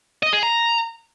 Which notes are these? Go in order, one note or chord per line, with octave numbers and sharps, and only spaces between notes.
D#5
G#4
A#5